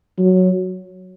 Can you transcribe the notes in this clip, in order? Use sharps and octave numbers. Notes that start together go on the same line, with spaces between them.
F#3